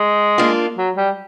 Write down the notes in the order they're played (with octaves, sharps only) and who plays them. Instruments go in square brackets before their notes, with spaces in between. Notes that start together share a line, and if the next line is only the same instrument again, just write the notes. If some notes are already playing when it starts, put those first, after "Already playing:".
Already playing: [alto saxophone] G#3
[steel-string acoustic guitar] A#3 D4 F4
[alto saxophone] F#3
G3